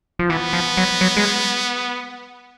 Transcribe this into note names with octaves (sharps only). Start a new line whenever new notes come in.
F3
E3 B3
F3
F#3
F#3
G#3